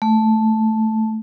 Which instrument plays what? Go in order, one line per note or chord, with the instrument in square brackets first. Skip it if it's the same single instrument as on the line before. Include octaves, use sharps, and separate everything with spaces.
[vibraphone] A3